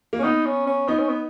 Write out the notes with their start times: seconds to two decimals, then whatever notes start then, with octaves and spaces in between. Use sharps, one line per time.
0.13 A#3
0.19 C#4
0.24 B3 D#4
0.46 C#4
0.67 C#4
0.88 B3 D#4
0.99 C#4
1.09 B3